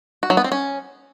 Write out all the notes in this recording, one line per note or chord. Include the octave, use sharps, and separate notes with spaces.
F#4
F#3
B3
C4
C#4